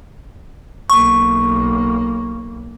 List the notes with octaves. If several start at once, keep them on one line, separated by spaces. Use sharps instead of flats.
B1 A#3 C#6